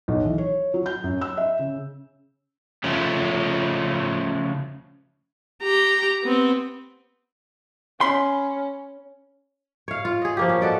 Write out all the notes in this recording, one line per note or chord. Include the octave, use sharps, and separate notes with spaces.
B1
E3
C#5
F#3
G6
F#2
E6
E5
C#3
C#3 F3 A3 C#4
G4 A#5
B3 C4
C#4 B5 C6
C#5 F5
F4
G#4 D#5
F3 A#3 G4
C#4
F#4 A4 D5 D#5